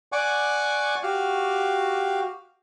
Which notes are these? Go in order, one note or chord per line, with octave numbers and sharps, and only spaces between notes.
D5 F#5 G#5 C#6 D6
F#4 G4 F5